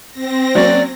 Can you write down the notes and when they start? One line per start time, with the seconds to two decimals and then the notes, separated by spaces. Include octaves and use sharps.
0.11 C4 A#6
0.55 F#3 A#3 C#4 D5